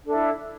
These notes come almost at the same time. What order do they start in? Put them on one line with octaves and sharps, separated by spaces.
D4 A4 E5 E4